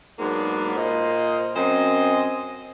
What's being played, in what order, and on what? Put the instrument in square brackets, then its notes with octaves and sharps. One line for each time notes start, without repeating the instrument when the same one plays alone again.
[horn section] G#2 F#3 A#3 B3 D4
A#2 C5 D#5
F#2 C4 C5 D#5 G#5